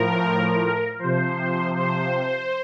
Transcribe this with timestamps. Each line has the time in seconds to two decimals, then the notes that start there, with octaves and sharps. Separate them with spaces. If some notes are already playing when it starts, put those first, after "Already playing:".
Already playing: A2 F3 A#4
0.99 C3 F3 C5
1.75 C5